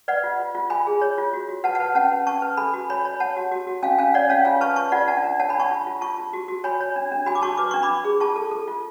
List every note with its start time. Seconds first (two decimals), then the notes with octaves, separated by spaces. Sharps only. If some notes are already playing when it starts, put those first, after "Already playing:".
0.08 B4 D5 F#5
0.24 F4
0.40 F4
0.55 F4
0.70 F4 G#5 B5
0.87 G#4
1.02 C#5
1.18 F4
1.33 F#4
1.48 F#4
1.64 B4 F#5 A5
1.75 F#5 A5
1.80 B4
1.95 C#4 F#5 A5
2.12 B4
2.27 C#4 A5 C#6
2.42 B4
2.57 A4 G#5 B5
2.73 F#4
2.90 C#5 G#5 B5
3.05 C#5
3.20 C#5 F#5 A5
3.37 F#4
3.51 F#4
3.67 F#4
3.83 C#4 F5 G#5
3.99 C#4 F5 G#5
4.14 C#5 D5 F#5
4.29 C#4 C#5 F5
4.45 F4 F5 G#5
4.61 B4 A5 C#6
4.76 B4 A5 C#6
4.92 F4 D5 F#5
5.07 D4 F#5 A5
5.24 D4
5.39 C#5 F#5 A5
5.49 G#5 B5
5.55 D4 A5 C#6
5.71 F4
5.86 F4
6.01 F4 A5 C#6
6.18 F4
6.33 F#4
6.48 F#4
6.64 C#5 G#5 B5
6.81 C#5
6.96 D4
7.12 D4
7.26 F#4 G#5 B5
7.35 D6
7.42 F#4 A5 C#6
7.58 B4 D6
7.71 D4 C#6
7.83 B5 D6
7.89 D4
8.04 G#4
8.20 F4 A5 C#6
8.36 A4
8.51 A4
8.67 F4